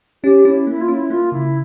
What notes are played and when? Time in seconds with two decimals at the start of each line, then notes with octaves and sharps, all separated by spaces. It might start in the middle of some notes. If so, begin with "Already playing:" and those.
0.23 C#4 G4
0.45 C#4 E4
0.67 A#3 E4
0.80 F4
0.88 C#4 E4
1.10 A#3 F4
1.32 C#3 E4